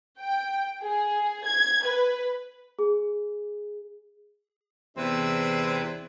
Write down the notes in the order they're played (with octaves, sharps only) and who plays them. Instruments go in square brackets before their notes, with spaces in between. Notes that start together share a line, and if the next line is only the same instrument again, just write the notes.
[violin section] G5
G#4
G#6
B4
[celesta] G#4
[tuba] E2 [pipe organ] C3 E4 B4 [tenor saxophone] C4 [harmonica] D4 E5